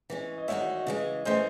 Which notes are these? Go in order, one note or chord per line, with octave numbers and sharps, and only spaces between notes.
E3 G#3 C#4
D#5
E2 D#3 G#3 D#4 F#4 C#5 E5
C#3 E3 G#3
A2 E3 A3 C#4 C5 D#5